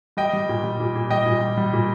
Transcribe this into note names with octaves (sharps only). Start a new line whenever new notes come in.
G3 D#5 G5
G3
A#2
G3
A#2
A#2
G3 D#5 G5
A#2
G3
G3
A#2